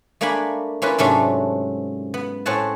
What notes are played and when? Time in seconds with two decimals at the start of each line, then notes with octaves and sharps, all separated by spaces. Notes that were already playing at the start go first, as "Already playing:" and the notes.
0.21 A3 A#3 D4 A#4 G#5 B5
0.82 A#3 C#4 E4 F4 B4
0.98 G#2 C3 F#3 A3 C#4 D4
2.14 B3
2.46 A2 C4 C#4 C#5 F#5 A5